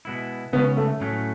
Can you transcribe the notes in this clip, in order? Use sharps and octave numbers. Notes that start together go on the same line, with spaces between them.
B2 G#3 B3 E4
C#3 G#3 B3 C#4 F#4
A3
A2 F#3 A3 C#4